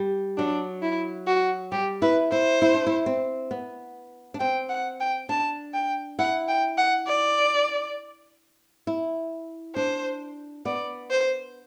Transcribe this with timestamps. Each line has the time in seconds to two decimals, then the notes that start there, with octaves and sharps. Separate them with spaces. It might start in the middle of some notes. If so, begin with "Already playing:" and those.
Already playing: G3
0.38 F#3 D4
0.82 E4
1.27 F#4
1.72 G3 G4
2.02 E4 B4
2.31 E4 C5
2.62 E4
2.74 D4
2.87 E4
3.06 C4
3.51 B3
4.34 D4
4.40 C4 G5
4.70 F#5
5.00 G5
5.29 D4 A5
5.74 G5
6.19 E4 F#5
6.48 G5
6.78 F#5
7.07 D5
8.87 E4
9.75 D4 C5
10.65 B3 D5
11.10 C5